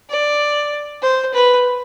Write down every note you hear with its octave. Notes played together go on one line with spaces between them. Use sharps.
D5
C5
B4